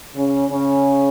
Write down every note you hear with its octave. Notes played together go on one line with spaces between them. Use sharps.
C#3 C#4
C#3 C#4